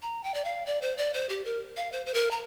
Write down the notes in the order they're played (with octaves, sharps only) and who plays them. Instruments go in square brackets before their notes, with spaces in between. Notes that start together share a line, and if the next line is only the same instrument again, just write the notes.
[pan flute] A#5
G5
D5
F5
D5
C5
D5
C5
G4
A#4
F5
C5
C5
A#4
A#5